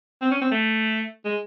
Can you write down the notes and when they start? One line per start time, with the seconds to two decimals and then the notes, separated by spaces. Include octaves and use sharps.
0.22 C4
0.31 C#4
0.41 C4
0.52 A3
1.25 G#3